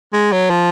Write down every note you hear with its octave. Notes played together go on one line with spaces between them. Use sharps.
G#3
F#3
F3